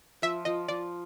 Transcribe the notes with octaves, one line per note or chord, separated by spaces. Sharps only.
F3 E5
F3 D#5
F3 D5